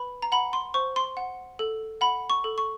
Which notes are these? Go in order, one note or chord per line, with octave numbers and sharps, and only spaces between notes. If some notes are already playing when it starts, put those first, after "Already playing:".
Already playing: B4 B5
A#5
F#5 B5
C6
C5 C#6
C6
F#5
A4
F#5 B5
C#6
A4
C#6